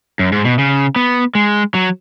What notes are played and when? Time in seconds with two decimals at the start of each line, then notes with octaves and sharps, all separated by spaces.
0.19 F#2
0.32 G#2
0.45 B2
0.58 C#3
0.96 B3
1.35 G#3
1.74 F#3